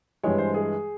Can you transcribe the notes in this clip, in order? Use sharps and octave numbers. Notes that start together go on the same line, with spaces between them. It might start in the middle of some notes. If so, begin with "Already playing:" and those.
G2 E3 G#3 C#5
C5
G#4